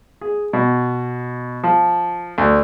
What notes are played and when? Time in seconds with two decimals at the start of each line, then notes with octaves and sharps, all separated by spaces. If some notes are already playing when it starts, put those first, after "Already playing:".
0.21 G#4
0.53 B2
1.63 F3
2.38 D2